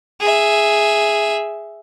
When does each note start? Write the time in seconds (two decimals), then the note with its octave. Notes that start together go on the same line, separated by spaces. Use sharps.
0.21 G#4 E5